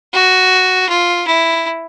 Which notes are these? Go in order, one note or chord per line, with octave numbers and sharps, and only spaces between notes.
F#4
F4
E4